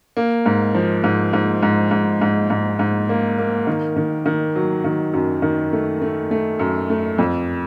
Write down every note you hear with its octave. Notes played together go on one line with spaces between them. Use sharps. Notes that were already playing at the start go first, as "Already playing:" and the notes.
A#3
G#2
F3
G#2
G#2
G#2
G#2
G#2
G#2
G#2
A#3
A#3
D#3
D#3
D#3
F#3
D#3
F#2
D#3
A3
A3
A3
F#2
A3
F2